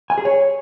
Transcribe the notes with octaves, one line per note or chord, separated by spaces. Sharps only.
G#5
G#4
C#5